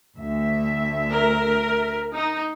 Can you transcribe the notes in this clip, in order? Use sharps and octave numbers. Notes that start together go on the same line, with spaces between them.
D2 E5
A#4
D#4